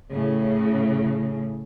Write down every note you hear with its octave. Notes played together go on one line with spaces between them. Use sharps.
A2 C#3